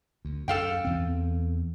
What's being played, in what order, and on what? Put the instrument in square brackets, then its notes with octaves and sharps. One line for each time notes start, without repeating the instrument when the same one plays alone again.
[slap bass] D2
[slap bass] F#2 [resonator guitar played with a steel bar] A4 F5 G5
[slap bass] E2 C4